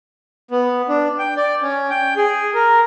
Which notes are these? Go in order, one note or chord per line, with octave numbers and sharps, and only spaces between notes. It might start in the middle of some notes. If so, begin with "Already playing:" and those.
B3
D4
G5
D5
C#4
G5
G#4
A#4